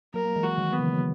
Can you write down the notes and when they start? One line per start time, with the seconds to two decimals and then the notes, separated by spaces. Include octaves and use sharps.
0.14 F#3 A#3 A#4
0.25 A#3
0.36 E3 G#3
0.43 F#4
0.58 D#3 F#3
0.73 B3
0.79 C#3 E3
0.93 F#3